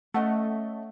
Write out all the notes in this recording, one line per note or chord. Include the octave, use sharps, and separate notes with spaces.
A3 C#4 D#5 F#5